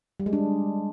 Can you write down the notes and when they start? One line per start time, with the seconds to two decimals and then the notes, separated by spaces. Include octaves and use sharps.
0.20 G3
0.26 G#3
0.33 D4